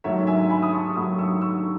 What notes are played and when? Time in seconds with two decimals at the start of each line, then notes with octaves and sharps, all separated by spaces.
0.04 G#2 D#3 F#3 A3 C#5 E5
0.27 E5 G#5
0.49 G#5 B5
0.63 D#6
0.73 A5 C#6
0.95 G#2 D#3 F#3 A3 B5 D#6
1.19 C#6 E6
1.41 C#6 E6